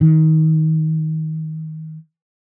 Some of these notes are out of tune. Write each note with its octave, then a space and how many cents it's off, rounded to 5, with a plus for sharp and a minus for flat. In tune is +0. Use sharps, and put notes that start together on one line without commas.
D#3 +25